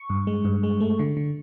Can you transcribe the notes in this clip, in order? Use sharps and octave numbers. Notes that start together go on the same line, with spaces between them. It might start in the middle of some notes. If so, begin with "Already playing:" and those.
Already playing: C#6
G2
G#3
G2
G#3
A3
D3
D3